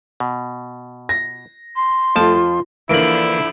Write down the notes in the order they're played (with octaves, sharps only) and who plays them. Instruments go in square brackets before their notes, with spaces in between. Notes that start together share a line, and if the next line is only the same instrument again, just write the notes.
[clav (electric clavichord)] B2
[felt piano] A#6
[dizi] C6
[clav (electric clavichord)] F2 F3 A5 [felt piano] A3 F4
[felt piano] F4
[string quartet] D3 F3 D4 [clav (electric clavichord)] E3 A#3 [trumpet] E4 [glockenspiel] D7 F#7